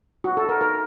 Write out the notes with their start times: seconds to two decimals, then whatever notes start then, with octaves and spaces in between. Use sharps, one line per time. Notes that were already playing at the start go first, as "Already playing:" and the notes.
0.24 F#4
0.37 A4
0.49 A#4
0.61 A#4